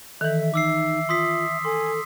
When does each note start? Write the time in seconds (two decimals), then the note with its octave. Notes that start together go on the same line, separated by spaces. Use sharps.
0.21 D#3 E3 A4 E5
0.54 D#4 D6 E6 C7
1.09 F4 C6 D#6 B6
1.65 A4 G#5 C6